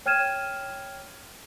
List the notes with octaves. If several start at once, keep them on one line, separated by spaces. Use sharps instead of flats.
C#5 G5 F6 G#6 D#7 E7